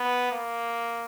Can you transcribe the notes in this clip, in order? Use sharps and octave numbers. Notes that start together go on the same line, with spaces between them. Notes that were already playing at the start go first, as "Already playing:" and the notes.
Already playing: B3
A#3